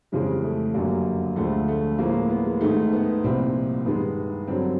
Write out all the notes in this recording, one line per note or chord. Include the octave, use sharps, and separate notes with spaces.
F2 C#3 E3 G3 G#3
A3
F#2 D3 G3 A#3
D2 D3 F3 G#3 A3
A3
A2 F3 G#3 A#3
B3
G#3
G#2 D#3 G#3 A3
B3
C2 A#2 F3 C4
G2 D#3 G#3 B3
G2 D3 F#3 C4